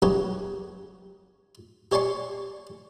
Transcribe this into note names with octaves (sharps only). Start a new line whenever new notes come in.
C#3 F#3 C#4 G4 B4 C#5
G4 C#5 D5 G#5 C6 C#6